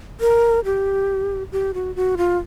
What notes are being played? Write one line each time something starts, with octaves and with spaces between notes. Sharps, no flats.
A#4
G4
G4
F#4
F#4
F4